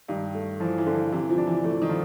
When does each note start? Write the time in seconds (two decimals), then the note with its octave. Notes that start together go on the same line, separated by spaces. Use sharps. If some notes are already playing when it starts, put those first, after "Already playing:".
0.08 G2 D#3
0.34 A3
0.60 E3 F3
0.78 E3
0.86 D3
0.95 E3
1.12 C3 E3
1.30 F3
1.38 D4
1.47 E3
1.64 E3 A3
1.82 D#3
1.89 F3